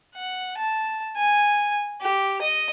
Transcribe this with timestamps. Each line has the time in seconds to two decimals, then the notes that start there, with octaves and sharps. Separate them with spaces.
0.15 F#5
0.58 A5
1.16 G#5
2.01 G4
2.41 D#5